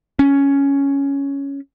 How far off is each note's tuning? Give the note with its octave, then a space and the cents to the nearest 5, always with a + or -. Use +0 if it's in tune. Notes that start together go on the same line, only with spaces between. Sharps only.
C#4 +5